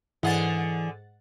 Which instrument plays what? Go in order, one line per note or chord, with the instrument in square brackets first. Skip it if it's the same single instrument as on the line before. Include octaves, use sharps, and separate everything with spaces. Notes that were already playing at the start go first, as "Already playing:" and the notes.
[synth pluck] G#2 F#5 A6 [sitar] D3 G#4 [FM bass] E3